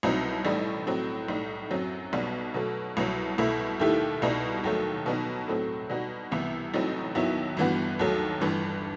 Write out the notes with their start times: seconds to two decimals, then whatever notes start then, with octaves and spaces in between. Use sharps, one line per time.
0.03 C2 B2 F#3 C4 D#4
0.45 A1 A2 G3 D#4
0.87 A2 F#3 C4
1.28 B1 A2 G3 D#4
1.71 F#2 F#3 C4
2.13 B1 B2 G3 B3 F#4
2.54 B2 F#3 A3
2.97 C2 B2 F#3
3.38 C2 B2 A3 E4
3.80 D#2 D#3 A3 E4 G4
4.22 C2 B2 G3 D#4
4.64 D#2 D#3 F#3 A3
5.06 B2 F#3 B3 D#4
5.48 A2 F#3 A3 C4
5.90 B2 G3 D#4 F#4
6.31 C2 C3 E3 B3 E4
6.74 A1 A2 F#3 C4 D#4
7.15 D#2 D#3 F#3 B3 E4
7.57 G1 G2 E3 B3 F#4
7.99 D#2 D#3 F#3 A3
8.41 G1 G2 E3